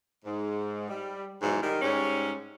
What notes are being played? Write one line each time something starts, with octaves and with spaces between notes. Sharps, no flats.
G#2
G3
G#2 B2 D#3 E3 F#3
D#3 G3
G#2 G3 C#4